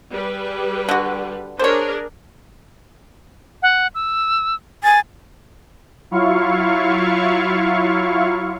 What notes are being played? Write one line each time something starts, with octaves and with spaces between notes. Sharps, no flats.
G3 G#4 B4
D3 F#4
D4 G#4 A#4 C5 C#5
F#5
E6
G#5 A6
F#3 E4 F4 F5 C#6